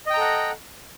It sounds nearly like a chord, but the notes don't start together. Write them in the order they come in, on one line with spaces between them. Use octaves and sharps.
D#5 G5 A#5 A4 F#5